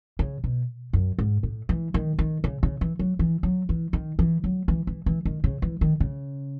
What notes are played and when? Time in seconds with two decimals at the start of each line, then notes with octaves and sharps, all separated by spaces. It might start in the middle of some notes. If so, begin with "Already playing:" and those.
0.19 C#3
0.44 B2
0.93 F#2
1.19 G#2
1.43 A2
1.69 E3
1.94 D#3
2.19 D#3
2.44 C#3
2.63 C#3
2.81 E3
2.99 F#3
3.19 E3
3.43 F#3
3.69 E3
3.93 D#3
4.19 E3
4.44 F#3
4.68 E3
4.87 E3
5.06 E3
5.25 D#3
5.44 C#3
5.62 E3
5.81 D#3
6.00 C#3